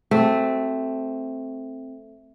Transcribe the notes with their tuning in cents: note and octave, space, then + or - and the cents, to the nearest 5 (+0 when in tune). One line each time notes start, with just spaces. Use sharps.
A3 +0 C4 +0 F#4 +35